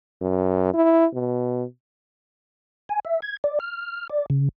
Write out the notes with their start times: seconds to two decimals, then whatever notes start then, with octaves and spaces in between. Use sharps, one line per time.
0.21 F#2
0.74 E4
1.14 B2
2.89 G#5
3.05 E5
3.22 G#6
3.44 D5
3.60 F6
4.10 D5
4.30 C#3